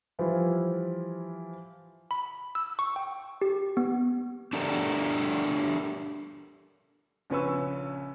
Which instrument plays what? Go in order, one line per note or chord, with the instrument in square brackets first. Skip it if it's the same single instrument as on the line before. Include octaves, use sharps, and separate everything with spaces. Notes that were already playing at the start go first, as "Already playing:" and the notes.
[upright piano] E3 F3 G3 E4 F4
[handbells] B5
E6
C#6
G5
G4
B3
[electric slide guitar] D4 G4 A4 A#4 D5 E5
[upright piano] A#1 C#3 C#4 B4 C#6 E6